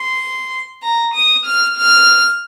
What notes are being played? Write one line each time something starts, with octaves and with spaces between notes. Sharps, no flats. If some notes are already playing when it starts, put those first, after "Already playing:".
Already playing: C6
A#5
D#6
F6
F6